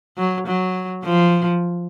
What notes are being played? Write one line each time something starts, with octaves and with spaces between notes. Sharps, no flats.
F#3
F#3
F3